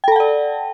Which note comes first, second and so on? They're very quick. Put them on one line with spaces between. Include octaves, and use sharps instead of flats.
G5 A4 A5 F#5 D5